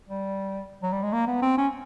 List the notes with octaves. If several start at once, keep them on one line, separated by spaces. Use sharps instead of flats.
G3
F#3
G3
G#3
A#3
B3
C4
C#4